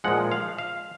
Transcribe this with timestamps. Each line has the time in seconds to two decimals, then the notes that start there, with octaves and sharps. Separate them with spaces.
0.04 A#2 F3 G#3 F#5
0.32 F5
0.58 F5